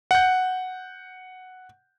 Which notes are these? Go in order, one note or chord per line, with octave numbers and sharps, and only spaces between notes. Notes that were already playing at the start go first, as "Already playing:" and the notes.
F#5 G6